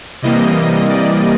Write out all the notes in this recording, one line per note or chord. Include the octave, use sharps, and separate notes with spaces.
C3 E3 G3 A#3 D#5
D5